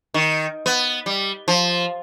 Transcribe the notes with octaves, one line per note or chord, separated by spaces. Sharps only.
D#3
B3
G3
F3